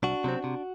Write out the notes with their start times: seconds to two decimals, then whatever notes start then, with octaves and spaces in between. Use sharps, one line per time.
0.03 C2 D4 F#4
0.24 C3 F#3 C4
0.44 C3